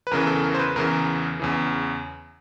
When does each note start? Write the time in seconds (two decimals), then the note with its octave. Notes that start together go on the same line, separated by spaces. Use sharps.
0.07 B4
0.11 E2 C#3 E3 A#4
0.27 A4
0.44 A#4
0.54 C5
0.59 B4
0.76 E2 C#3 E3 A#4
1.39 E2 C#3 E3